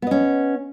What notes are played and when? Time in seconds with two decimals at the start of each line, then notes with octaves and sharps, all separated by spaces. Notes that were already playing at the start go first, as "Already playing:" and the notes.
0.02 B3
0.07 D#5
0.11 C#4